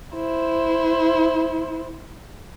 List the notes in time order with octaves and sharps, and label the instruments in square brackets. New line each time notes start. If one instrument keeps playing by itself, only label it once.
[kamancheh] E4 C5